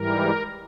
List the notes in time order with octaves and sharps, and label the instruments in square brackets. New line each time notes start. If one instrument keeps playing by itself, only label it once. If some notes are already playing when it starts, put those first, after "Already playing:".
Already playing: [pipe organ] G#2 E3 G3 A#4